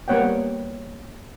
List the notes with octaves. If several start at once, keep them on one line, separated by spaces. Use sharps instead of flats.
G3 A#3 B3 C#5 F#5 G5